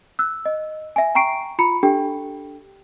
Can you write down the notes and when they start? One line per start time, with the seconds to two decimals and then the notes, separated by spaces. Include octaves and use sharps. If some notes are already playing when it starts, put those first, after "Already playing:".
0.19 E6 F#6
0.45 D#5
0.96 E5 G#5
1.15 G5 A#5 C#6 C7 D7
1.59 F4 A#5 B5 C#7
1.83 D4 G4 A4 G5